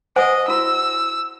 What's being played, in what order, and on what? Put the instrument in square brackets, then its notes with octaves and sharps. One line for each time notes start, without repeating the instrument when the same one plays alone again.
[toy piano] C5 F#5 G#5 [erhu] D#5
[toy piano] E4 F#4 [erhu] E6